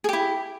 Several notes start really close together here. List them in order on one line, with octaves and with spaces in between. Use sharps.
G#4 G4 E4